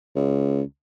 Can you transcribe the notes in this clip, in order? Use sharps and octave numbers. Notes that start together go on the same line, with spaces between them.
C#2